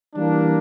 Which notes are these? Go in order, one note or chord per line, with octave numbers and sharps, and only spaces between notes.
E3 G3 A#3 D4